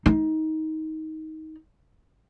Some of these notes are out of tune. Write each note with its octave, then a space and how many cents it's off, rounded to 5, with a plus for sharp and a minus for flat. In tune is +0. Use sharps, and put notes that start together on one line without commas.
D#4 +20